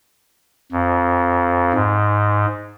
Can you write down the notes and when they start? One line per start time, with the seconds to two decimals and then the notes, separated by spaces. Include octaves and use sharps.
0.72 F2
1.74 G#2